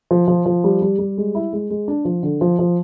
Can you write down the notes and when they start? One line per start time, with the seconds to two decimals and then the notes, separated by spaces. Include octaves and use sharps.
0.11 F3
0.28 F3
0.46 F3
0.64 G3
0.82 G3
0.99 G3
1.17 G#3
1.35 E4
1.53 G#3
1.70 G#3
1.88 D4
2.05 F3
2.23 D3
2.41 F3
2.59 F3